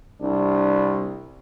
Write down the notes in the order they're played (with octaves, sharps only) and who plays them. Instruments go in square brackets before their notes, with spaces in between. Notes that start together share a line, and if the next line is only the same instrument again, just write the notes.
[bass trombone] C2 [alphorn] D4